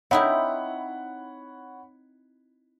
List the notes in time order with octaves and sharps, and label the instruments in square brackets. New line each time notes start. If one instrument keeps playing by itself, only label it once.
[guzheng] C4 D#4 E4 [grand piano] C#5 F#5 B5